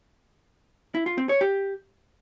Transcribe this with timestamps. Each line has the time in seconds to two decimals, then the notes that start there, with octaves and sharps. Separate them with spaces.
0.95 E4
1.06 F4
1.18 C4
1.29 C#5
1.41 G4